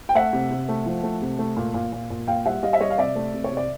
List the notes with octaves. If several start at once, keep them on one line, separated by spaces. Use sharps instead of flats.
G5
A3 E5 F#5
C3
C3
A3
F3
A3
C3
A3
A#2
A#2
A#2
A#2
A#2 F5 G5
G3 E5 F#5
G3 D#5 F5
E5
G3 C#5 D#5
F5
C3 D5 E5
A3
C3
C#5
C3
D5